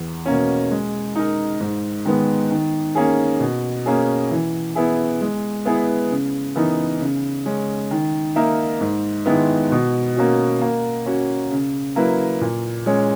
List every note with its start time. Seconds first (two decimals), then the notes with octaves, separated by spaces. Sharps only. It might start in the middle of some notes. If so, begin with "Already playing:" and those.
Already playing: E2
0.26 B2 A#3 C#4
0.71 G#3
1.16 D#4 A#4
1.61 G#2
2.05 D#3 G#3 B3
2.50 D#3
2.95 A#3 C#4 G#4
3.40 B2
3.86 A#3 C#4 G#4
4.31 E3
4.75 B3 E4 G#4
5.21 G#3
5.65 B3 E4 G#4 B4
6.11 C#3
6.56 E3 B3 D#4 A#4
7.01 C#3
7.46 G#3 C#4
7.91 D#3
8.36 A#3 D#4 A#4 E5
8.81 G#2
9.26 D#3 G#3 B3 E4
9.72 B2
10.17 A#3 C#4 F#4
10.62 A#3
11.06 C#4 F#4
11.52 C#3
11.96 F#3 A#3 E4 B4
12.41 A#2
12.86 G#3 C#4 G#4 C#5